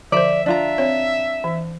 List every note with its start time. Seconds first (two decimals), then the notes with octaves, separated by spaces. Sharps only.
0.12 D3 F3 C5 D5 E5
0.46 D4 F4 E5 A#5
0.78 C4 C#5
1.44 E3